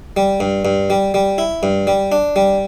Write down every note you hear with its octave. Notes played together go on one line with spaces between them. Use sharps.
G3
G2
G2
G3
G3
E4
G2
G3
D4
G3